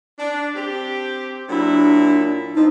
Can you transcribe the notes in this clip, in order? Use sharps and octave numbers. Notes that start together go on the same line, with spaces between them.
D4
C4 G4
A#2 F#3 D4 E4
F3 B3 C4 D#4